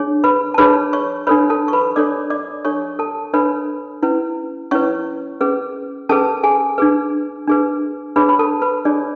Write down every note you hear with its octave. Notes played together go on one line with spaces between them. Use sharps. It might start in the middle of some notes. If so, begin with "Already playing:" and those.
Already playing: D4 G#4 C#5
B4 B5
A5
D4 G#4 B4 C#5 B5
C#5 C#6
D4 A4 B4 C#5 B5
A4 A5
C#6
B4 B5
D4 A4 C#5 D5 D6
D5 D6
D4 A4 C#5 C#6
A4 A5
D4 A4 B4 C#5 B5
C#4 E4 B4
C#4 E4 B4 C#5 C#6
C#4 G#4 B4
C#4 G#4 A4 B4 A5
G#4 G#5
D4 G#4 B4
D4 G#4 B4
D4 G#4 B4 C#5 B5
B5
A4 A5
B4 B5
D4 G#4 C#5 D5